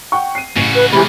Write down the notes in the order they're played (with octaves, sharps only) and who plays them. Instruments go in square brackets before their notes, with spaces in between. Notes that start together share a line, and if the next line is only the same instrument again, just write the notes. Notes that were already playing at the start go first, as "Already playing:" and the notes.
[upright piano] F#5 G5 C#6
C7 D#7
[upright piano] A1 [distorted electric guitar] C#3 F#4
[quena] B4
[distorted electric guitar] B1 [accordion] C3 E3 [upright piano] G#3 [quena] B5